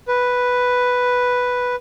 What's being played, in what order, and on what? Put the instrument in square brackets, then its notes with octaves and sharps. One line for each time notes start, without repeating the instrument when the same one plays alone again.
[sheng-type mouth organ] B4